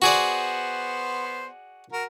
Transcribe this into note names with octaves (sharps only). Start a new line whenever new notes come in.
B3 F#4 G#4 C5 D5
F#4 A#4